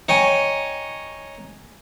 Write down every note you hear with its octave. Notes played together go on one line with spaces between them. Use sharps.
D#4 C#5 G5 G#5